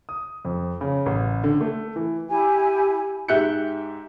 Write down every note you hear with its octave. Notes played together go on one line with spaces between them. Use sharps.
D#6
F2
C#3
A1
D3
A3
E3
E4 G4 G#5
G#2 G4 E5 F#6 G6 C#7